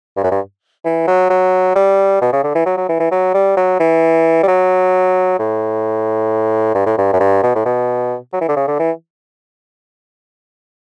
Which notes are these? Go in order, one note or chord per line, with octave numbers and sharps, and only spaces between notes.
G2
F#2
G2
E3
F#3
F#3
G3
B2
C#3
D3
E3
F#3
F#3
E3
E3
F#3
G3
F#3
E3
G3
F#3
A2
G2
A2
G2
F#2
G2
B2
A2
B2
F#3
E3
D3
C#3
D3
E3